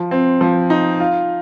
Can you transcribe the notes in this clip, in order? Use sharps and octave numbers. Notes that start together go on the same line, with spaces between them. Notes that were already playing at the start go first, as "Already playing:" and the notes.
Already playing: F3
C4
F3
D#4
F4